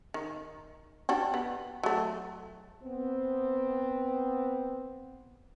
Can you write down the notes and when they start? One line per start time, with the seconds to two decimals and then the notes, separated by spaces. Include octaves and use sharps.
0.14 D#3
1.09 D4 F#4 G4
1.34 B3
1.83 F#3 A3
2.83 B3 C4